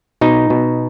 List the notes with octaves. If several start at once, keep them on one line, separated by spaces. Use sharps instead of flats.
B2 D#4
B2